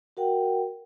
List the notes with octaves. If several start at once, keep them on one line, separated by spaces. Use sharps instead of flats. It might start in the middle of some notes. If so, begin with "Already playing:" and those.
F#4 A#4 F#5 G5